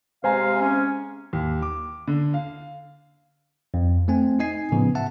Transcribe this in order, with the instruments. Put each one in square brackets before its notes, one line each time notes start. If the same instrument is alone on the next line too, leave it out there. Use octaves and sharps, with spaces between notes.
[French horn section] C3 G#3 [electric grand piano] C5 G#5 A#5 [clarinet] F5
[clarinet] C#4
[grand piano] D#2
D6
D3
F5
[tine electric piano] F2
A3 C4 G#5
D#4 D#5 G#5 C7
A2 C#3 F3 B3
E5 F#5 A5